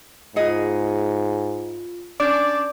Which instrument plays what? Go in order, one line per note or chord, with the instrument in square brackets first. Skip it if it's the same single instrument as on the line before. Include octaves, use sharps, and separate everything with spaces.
[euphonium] G#2 [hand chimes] F4 C#7 [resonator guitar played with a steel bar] G#4 D#5
[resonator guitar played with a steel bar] C#4 D4 [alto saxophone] D5 [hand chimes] D6 G6